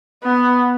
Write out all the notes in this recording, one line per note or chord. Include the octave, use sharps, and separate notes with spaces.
B3